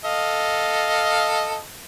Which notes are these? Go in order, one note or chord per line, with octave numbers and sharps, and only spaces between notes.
A4 D#5 F5